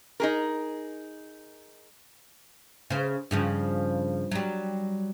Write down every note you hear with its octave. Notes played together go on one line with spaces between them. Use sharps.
D#4 G#4 A#4
C#3 C5
G2 C#3 F3
F#3 G3